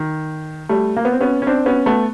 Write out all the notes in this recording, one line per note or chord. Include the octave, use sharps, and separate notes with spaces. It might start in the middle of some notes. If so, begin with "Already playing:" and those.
Already playing: D#3
G3 A3
A#3
B3
C4
B3 C#4
C#4
C4 D4
B3 C#4
A3 B3